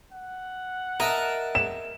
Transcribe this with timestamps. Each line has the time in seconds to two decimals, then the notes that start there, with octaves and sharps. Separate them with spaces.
0.12 F#5
1.00 A#4 D#5 E5 A5
1.55 E7